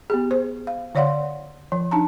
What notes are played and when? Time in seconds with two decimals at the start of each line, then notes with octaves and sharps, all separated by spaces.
0.10 B3 G4 G#4
0.31 C5
0.67 F5
0.95 D3 C#5 D5 F5 F#5 C6
1.72 F3
1.91 D4 D#4 A5 A#5